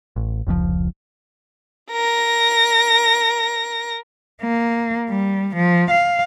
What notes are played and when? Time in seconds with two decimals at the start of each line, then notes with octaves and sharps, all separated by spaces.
0.16 A1
0.47 F1 C#2 A#2 F3
1.91 A#4 A#6
4.42 A#3
5.09 G3
5.55 F3
5.90 F5